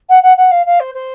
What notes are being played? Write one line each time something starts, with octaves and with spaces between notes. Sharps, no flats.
F#5
F#5
F#5
F5
F5
C5
C5